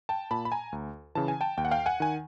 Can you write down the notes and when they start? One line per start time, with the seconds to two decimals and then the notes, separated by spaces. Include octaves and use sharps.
0.09 G5 A5
0.31 A#2 A5 B5
0.45 B5
0.52 G#5 A#5
0.72 D2
1.15 C#3 E3 A5
1.28 G#5
1.41 G5 A5
1.57 D#2 G5
1.65 F#5
1.71 F5 G5
1.86 F#5 G#5
2.00 D#3 G#5